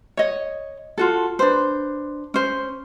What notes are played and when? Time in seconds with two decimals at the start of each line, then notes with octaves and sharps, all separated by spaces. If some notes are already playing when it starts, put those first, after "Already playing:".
0.17 C#5 D#5
0.98 F4 F#4 A4
1.39 D4 B4 C5
2.34 C#4 C5